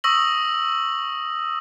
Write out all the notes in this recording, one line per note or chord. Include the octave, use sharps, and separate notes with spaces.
C#6 D#6 E6 A#6 F#7